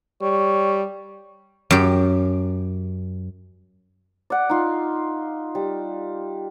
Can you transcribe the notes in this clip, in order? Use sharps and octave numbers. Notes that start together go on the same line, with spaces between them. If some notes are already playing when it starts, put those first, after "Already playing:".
G3 C#5
F#2 G4
D5 F#5
D#4 F4
G3